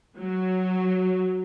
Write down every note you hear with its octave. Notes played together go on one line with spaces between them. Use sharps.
F#3